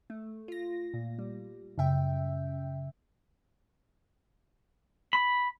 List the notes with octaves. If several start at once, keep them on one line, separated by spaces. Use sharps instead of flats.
A3
F4 A#6
A#2
G3
F#2 C#3 E5 G5
B5